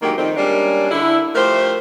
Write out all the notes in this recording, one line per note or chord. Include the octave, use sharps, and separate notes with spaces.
D3 D#3 F#3 G#3 A#3 G4
D#3 F3 G3 A3 C4 D#4
G3 G#3 A#3 C#4 D4
D3 E4
F3 A3 G4 A#4 C5